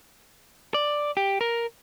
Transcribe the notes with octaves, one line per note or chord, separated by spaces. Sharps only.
D5
G4
A#4